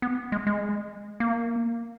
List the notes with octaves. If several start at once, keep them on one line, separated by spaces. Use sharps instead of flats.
B3
G#3
G#3
A#3